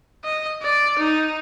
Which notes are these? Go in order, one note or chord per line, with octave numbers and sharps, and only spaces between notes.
D#5
D5
D#4